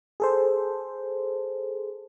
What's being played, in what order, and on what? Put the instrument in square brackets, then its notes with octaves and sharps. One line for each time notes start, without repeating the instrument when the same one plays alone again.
[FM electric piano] G#4 A4 C5